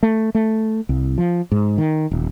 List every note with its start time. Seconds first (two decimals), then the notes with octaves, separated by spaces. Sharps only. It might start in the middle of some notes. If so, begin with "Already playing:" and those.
0.03 A3
0.35 A3
0.89 C2
1.18 F3
1.52 G#2
1.78 D#3
2.11 D#1